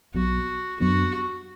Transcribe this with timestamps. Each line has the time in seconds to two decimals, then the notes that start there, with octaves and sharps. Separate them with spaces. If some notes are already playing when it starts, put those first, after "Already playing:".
0.14 B1 B2 F#3 F#4
0.80 F#2 F#3 B3 D4 F#4